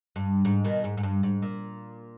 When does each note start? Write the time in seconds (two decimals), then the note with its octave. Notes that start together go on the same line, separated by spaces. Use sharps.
0.16 G2
0.45 G#2
0.64 B2 D#3
0.84 G#2
0.97 G#2
1.03 G2
1.23 G#2
1.42 A#2